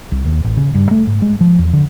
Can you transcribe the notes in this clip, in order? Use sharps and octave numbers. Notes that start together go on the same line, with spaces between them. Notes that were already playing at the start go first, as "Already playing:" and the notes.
C2
D#2
A1
C#3
G2
A3
G#2
G#3
F3
E2
D3